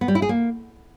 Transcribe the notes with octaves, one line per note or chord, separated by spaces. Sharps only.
B3
G3
E4
G#4
A#3